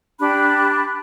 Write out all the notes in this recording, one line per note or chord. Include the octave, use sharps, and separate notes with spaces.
D4 G4 B5 F#6